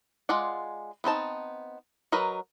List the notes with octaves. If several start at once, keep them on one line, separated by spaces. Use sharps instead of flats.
G#3 F4 D5 F#5
B3 C4 D#4 A5
F#3 A#4 B4 D#5